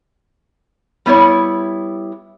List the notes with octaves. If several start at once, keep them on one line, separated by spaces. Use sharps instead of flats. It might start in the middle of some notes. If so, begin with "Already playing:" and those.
G3 B3 E4 C#5